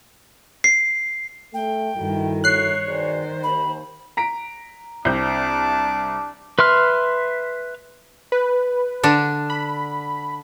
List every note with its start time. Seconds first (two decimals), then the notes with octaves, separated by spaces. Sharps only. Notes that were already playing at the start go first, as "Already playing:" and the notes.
0.64 C7
1.54 A3 G5
1.96 G2 D#3 E4 F#4 A4
2.44 C#5 F#6 C7
2.87 B2 D#3 G#4 C5 D5
3.43 D#2 B5
4.17 A#5 B6 D7
5.05 C2 C4 D4 A5 D6 G6
6.59 B4 E5 C6 F6
8.32 B4
9.03 D3 D4
9.50 B5